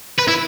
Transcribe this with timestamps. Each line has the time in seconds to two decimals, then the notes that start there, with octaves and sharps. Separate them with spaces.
0.18 B4
0.28 E4